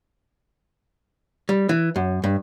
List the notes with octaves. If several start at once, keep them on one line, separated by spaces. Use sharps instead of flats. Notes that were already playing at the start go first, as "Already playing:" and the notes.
G3
E3
F#2
G2